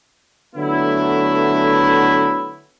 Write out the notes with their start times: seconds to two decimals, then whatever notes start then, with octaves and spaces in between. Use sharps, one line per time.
0.56 D3 F#3 A3 B3 E4